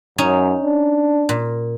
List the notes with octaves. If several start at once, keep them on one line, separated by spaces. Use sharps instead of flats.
F#2 C#4 D#4
D4
A#2